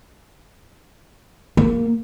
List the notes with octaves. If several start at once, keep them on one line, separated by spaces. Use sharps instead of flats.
A#3